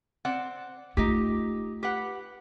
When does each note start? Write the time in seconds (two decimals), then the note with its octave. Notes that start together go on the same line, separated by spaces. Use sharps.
0.25 C4 D5 F#5
0.97 A3 D#4 F4 G4
1.83 G4 B4 F#5